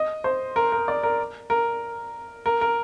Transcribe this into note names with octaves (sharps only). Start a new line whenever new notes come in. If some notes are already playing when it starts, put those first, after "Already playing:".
Already playing: D#5
C5
A#4
A#4
D5
A#4
A#4
A#4
A#4